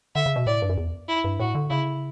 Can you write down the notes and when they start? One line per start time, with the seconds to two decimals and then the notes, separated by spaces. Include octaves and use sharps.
0.16 D3 E5
0.26 C#3
0.36 B2
0.47 A2 D5
0.62 G2
0.69 F#2
0.78 E2
1.08 E4
1.24 G2
1.40 A2 F#4
1.55 D3
1.70 C#3 E4